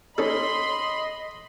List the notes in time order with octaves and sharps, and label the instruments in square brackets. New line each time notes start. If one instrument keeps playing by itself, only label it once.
[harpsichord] C#4 D#4 A4 [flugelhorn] D#5 [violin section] B5 C6